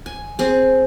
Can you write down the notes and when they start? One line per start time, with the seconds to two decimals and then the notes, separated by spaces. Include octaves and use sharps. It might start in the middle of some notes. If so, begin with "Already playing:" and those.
0.06 G#5
0.39 C4 G#4